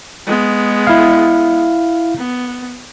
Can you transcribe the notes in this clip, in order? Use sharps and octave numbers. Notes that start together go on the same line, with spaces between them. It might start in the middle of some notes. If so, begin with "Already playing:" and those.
G#3 B3
E4 F5
B3